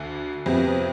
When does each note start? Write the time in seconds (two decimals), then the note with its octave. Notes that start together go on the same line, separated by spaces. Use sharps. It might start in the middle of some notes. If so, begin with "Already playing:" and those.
Already playing: D2 D3
0.46 F2 C3 F3 B3